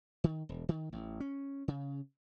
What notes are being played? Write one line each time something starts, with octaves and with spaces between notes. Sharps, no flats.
D#3
E1
D#3
A1
C#4
C#3